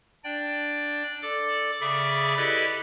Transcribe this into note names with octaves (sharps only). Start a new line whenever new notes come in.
D4 D5 G5
A4 D5 D6
C#3 G#4 D5 E5 B5 D6
E4 G4 A4 B4 D5 D#5